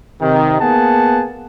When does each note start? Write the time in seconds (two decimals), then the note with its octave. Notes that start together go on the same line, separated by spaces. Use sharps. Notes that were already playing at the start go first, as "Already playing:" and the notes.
0.21 C3 D#3
0.61 A#3 B3 G#4 F#5 A5